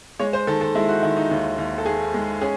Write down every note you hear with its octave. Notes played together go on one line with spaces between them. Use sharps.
G#3 C#5
C5
D#3 A4
A4
G#3 E4
F#4
D#3 E4
D#4
D#2
D#2
A4
D#3 G#4
G#3
C#4 G#4